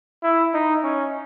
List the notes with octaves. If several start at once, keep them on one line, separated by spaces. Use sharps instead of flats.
E4
D#4
C#4